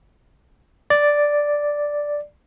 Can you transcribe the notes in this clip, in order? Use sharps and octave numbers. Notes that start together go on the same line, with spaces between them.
D5